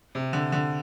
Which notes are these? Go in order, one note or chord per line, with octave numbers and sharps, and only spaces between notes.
C3
D3
D3